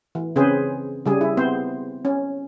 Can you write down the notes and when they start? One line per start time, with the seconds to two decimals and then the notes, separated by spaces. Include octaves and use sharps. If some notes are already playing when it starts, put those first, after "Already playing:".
0.15 E3
0.36 C#3 C4 C#4 G#4 B4 C5
1.06 C#3 G3 G#4
1.21 E4
1.37 B3 C4 C5
2.05 C#4